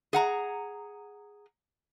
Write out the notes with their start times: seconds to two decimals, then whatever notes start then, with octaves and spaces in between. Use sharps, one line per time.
0.13 G#4 F#5 A#5